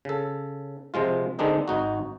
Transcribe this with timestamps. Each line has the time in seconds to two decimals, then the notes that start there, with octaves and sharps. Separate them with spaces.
0.05 C#3 A4
0.94 C3 F3 G#3 F4
1.39 D3 D#3 G#3 C4 D4 D#4
1.68 G#1 D#4 F#4